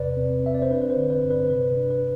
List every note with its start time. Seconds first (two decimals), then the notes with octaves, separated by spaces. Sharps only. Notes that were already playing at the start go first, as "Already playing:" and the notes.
Already playing: E2 C3 B4 D5
0.17 C4
0.43 C4 E5
0.54 D5
0.62 C5
0.70 D4 B4
0.82 B4
0.90 C5
0.96 D3
1.10 B4 D5
1.23 G2
1.30 B4
1.39 C5
1.50 C3 B4
1.76 D4
1.90 B4